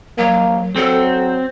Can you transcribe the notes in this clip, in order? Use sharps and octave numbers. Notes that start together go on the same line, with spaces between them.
F#3 A#3
F#3 C4 A4